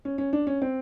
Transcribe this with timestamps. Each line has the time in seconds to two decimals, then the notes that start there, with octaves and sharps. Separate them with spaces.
0.05 C#4
0.18 C#4
0.33 D4
0.47 C#4
0.62 C4